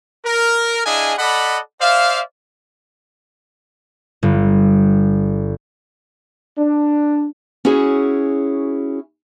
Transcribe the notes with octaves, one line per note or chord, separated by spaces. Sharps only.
A#4
D4 E4 G#4 D#5 F5 G#5
A4 D5 D#5 F#5 B5
C5 D5 E5 F5
G1
D4
C#4 E4 F#4 G#4 C#5